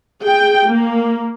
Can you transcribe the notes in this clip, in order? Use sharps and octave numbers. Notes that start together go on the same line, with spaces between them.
G#4 G5
A#3